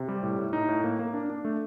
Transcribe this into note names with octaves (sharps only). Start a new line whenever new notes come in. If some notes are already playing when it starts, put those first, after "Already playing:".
Already playing: C3
G3
A2
A2
D#4
A2
A#3
A#3
D4
D4
A3